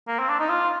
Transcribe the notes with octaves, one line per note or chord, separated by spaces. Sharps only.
A#3
C4
D4
D#4
F4